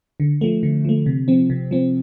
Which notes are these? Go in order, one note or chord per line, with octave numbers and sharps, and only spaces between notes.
D3
F3 A3
D3
F3 A3
C3
F3 C4
C3
F3 C4